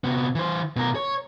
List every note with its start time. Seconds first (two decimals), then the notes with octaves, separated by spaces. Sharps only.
0.04 C3 B3
0.35 E3 C5
0.76 B2 A#4
0.95 C#5